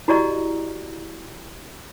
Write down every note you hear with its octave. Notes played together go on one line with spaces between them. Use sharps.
E4 F#4 G4 D5 D#5 A#5